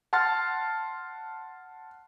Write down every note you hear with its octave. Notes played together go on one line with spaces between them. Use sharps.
F#5 A5 C6 F6 A6